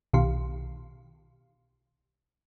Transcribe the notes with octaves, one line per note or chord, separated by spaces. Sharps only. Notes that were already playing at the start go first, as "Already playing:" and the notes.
B1 B2 D#3 G4 F5 C6